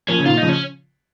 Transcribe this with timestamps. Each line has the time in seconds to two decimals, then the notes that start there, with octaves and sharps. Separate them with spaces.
0.08 F3 A#3 C#4
0.19 C#3
0.25 A#2 D#3 F4
0.38 C#3 F3 D#4
0.49 C#4